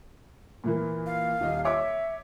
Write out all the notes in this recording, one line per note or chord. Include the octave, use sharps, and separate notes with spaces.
A#2 E3 A#3
F5
D#1 D#5
C#5 E5 D6